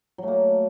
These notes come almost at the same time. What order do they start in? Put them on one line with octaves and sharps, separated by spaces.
F#3 A3 A#3